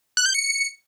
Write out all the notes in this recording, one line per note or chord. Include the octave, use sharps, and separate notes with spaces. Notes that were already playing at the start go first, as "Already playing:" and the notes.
F#6
G6
C#7